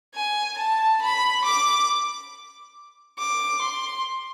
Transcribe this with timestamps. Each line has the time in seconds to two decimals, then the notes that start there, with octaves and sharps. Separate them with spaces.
0.15 G#5
0.58 A5
1.02 B5
1.45 D6
3.19 D6
3.62 C6